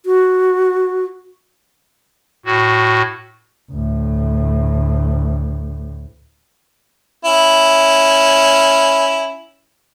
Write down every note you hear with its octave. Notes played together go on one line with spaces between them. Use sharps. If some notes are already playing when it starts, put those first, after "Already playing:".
F#4
A2 F#4
D2 A2
C#4 E4